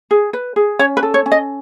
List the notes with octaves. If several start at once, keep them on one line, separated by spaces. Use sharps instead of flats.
G#4
B4
G#4
C#4 C#5
B4
A4
C#5
C#4
D#5